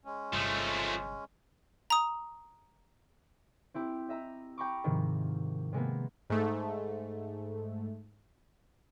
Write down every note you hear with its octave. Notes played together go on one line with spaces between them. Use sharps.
G#3 C#4
G1 C3 F3 A3
A#5 D#6
C4 E4 G4
D#5 E5 A#5
G5 A#5 B5 C#6 D6
G#2 C3 D#3 F3
C3 G#3 A#3 B3
G#2 A3